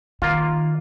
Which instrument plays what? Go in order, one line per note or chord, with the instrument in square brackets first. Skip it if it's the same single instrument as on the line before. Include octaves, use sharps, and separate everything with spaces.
[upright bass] D#3 [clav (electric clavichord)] A#3 F4